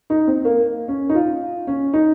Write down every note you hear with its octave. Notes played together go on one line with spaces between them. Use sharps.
D#4
C4
A#3
C#4
D#4
F4
C#4
D#4